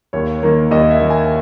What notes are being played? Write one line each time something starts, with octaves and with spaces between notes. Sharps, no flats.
D#2 C#5
D#3 A#3
D#2 D#5
E5
D#3 A#3
G#5